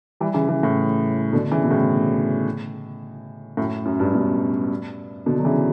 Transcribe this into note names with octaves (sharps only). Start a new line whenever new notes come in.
E3 G3
C#3 E3
C#3 E3
A2 C#3
B2 D3
C#3 E3
B2
A2 C#3
F#2 A2
F#2
G2
G2 B2
B2 D3
F#3
C#3 E3